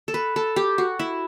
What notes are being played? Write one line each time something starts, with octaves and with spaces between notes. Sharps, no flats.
A4
B4
A4
G4
F#4
E4